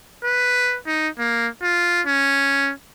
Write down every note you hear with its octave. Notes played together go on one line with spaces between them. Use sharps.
B4
D#4
A#3
F4
C#4